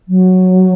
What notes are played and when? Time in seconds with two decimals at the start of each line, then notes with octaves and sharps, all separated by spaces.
0.08 F#3